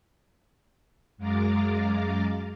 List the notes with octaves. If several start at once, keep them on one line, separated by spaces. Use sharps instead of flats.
F#2 G#3 F5 A#5 D6 A6